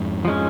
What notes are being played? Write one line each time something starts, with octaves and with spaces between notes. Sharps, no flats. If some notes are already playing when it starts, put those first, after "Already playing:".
Already playing: F2 G#2
F3 G#3 C#4